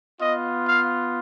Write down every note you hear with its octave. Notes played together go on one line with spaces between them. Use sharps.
B3 F4 D#5
F5